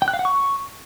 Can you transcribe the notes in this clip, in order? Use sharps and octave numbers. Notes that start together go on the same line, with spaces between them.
G5
F#6
F5
F#5
C#6